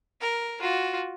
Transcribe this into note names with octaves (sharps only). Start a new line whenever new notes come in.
A#4
F4 F#4